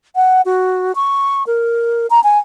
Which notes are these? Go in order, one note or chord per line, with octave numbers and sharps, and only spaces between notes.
F#5
F#4
C#6
A#4
A#5
G#5